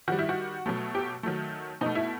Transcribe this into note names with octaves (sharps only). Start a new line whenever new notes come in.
D#3 G3 F#4
E4
F#4
B2 F#3 A3
G4
D#3 F#3 A3
B2 A3 D#4
E4